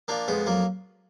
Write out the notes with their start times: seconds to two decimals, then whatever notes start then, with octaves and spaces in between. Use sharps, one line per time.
0.08 F3 A#3 D4
0.28 F2 G#3 B3
0.46 F2 F#3 A#3